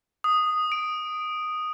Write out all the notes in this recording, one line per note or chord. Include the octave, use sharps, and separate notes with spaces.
D#6
D7